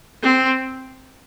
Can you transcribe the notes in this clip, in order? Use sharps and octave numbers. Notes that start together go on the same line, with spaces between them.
C4